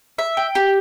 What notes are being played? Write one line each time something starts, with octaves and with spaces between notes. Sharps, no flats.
E5
G5
G4